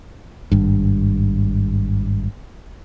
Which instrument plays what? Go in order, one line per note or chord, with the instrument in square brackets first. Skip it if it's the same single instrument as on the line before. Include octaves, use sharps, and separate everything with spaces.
[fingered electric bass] G#1 G2